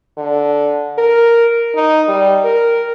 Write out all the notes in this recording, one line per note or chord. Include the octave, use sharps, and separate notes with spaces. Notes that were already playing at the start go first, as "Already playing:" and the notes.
D3
A#4
D#4
G3
A#4